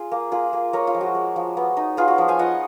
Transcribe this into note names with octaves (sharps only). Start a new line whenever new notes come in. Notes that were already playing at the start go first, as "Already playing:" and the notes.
Already playing: F4 G#4
A#3
A#3 F4 G#4
A#3
G#3 A#4 C#5
F4
F3
F#4
G#3
F3
B3
D#4
B3 F4 G#4
F#4
F3
F5 G#5
F4 D#5 F#5